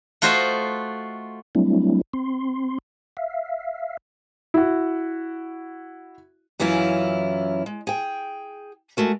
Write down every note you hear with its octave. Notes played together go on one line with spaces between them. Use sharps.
A3 F4 F#4 C5 D#5
F#3 G3 A3 C4 D4 E4
C4 C6
E5 F5
E4 F#4
F#2 E3 F#3 C#4 E4 F4
G#3
G#4 G5
G#3 A3 F#4 A#4